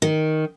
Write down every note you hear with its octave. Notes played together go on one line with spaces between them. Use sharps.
D#3